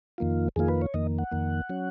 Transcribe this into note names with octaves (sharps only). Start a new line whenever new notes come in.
F2 D#3 A#3 F4
F2 D#3 A#3 F4 G#4
B4
C#5
F2 D#3 A#3 D#5
F#5
F2 D#3 A#3
F#3 C#4